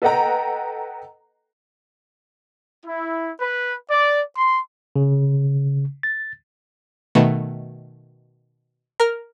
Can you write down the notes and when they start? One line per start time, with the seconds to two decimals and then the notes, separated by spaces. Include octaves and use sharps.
0.02 A4 B4 D#5 F#5 G5 A#5
2.85 E4
3.40 B4
3.90 D5
4.35 C6
4.96 C#3
6.03 A6
7.15 B2 D#3 A3 B3
9.00 A#4 F6